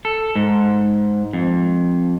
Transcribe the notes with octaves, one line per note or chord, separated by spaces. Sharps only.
A4
G#2
F2